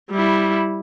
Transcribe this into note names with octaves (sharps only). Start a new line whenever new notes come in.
G3 E4